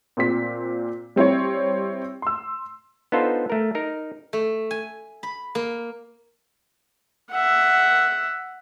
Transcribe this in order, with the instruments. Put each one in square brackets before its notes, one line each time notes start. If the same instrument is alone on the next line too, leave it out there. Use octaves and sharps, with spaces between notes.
[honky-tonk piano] A#2 C4 B6
G3 C4 E4 C#5
C6 E6
[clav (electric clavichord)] B3 D4 D#4 F4 A4 C5
A3 A#4
D#4 A#4
[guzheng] A3
G#5
B5
A#3
[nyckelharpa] E5 F#5